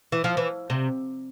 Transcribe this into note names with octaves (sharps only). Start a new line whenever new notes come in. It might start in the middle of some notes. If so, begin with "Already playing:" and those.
E3
F3
E3
C3